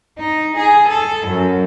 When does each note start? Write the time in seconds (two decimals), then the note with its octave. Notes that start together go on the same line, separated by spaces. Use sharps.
0.18 D#4
0.57 G#4
0.87 A4
1.27 F#2